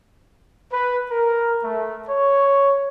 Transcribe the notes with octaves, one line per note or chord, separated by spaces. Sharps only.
B4
A#4
A3
C#5